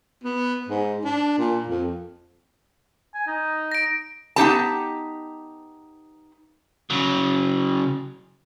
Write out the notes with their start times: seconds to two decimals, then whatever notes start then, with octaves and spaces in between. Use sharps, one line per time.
0.24 B3
0.69 G#2
1.04 D4
1.38 A#2
1.68 F2
3.14 G#5
3.27 D#4
3.72 A#6 D7
4.36 B3 D#4 G4 A5
6.90 C#3 F#3